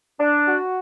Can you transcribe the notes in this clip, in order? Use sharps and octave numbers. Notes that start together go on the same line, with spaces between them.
D4
F#4